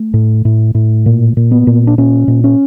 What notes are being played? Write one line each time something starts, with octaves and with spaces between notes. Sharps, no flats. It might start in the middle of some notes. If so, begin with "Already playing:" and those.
Already playing: A3
A2
A2
A2
A#2
A#2
B3
A#2
D4
A#2 C#4
A#2
C#4